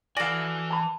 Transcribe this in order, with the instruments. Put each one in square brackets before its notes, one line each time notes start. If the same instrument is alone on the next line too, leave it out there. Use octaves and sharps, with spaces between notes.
[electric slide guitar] E3 G#5 [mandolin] F#4 A4 [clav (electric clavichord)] D5 F5
[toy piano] A5 B5